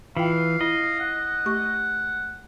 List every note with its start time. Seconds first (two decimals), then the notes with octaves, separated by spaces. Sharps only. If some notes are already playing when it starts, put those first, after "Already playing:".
0.17 E3 F4 F5 G5
0.61 E4 D#5
1.00 F#5
1.46 A3 G4 C#6